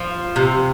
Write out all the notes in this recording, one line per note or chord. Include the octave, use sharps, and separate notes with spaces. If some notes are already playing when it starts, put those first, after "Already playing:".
Already playing: F3
C3